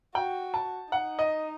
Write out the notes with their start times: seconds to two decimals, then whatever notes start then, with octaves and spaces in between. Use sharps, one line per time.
0.15 F#4 G5
0.54 A5
0.92 D#4 F#5
1.19 D#5